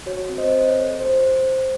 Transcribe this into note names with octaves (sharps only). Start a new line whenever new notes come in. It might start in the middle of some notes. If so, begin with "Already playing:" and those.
F#4 C#5
C4
C5 D#5
C4
C#5
A4
F#4 C5